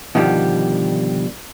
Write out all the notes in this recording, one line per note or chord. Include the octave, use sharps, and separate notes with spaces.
B2 D3 D#3 F3 G3